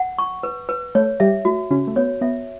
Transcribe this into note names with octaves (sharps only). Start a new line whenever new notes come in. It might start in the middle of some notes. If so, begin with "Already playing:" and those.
Already playing: F#5
C#6
B4
B4
A3 A4 C#5
G3 G4 E5
A3 F#4
C#3 C#4 F#4
A3
B3 C#5
B3 E5